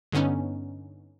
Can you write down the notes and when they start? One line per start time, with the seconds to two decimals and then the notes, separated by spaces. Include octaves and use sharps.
0.12 G2 D3 B3 C#4 D#4